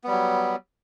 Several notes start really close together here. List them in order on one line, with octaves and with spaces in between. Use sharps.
B3 G3 F#3